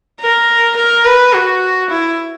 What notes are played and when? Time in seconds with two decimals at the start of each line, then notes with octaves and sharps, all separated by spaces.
0.21 A#4
0.77 A#4
1.05 B4
1.33 F#4
1.90 E4